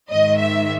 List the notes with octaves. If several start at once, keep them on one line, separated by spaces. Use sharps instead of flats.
G#2 D#3 D#5
E5